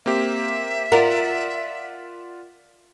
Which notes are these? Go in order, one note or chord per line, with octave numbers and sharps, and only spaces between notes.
A#3 C4 G4 E5
F4 A#4 D5 F#5